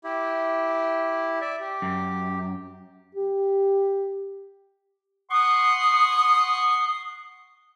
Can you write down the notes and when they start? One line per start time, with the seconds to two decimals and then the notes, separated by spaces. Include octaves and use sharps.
0.04 E4 G4
1.41 D5 E5
1.60 G4
1.82 F#2
3.15 G4
5.31 F#5 C6 C#6 D#6